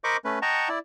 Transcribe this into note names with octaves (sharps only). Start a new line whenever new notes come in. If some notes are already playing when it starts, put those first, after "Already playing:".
A#4 C5 D#5 B5 C#6 D6
A3 C#4 B4
D#5 F#5 G5 A5 A#5 C#6
E4 D5